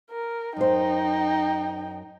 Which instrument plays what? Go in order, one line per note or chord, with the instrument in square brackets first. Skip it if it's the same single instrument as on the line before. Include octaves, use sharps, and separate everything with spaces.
[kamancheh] A#4
[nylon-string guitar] F#2 C5 [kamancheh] D#4 G5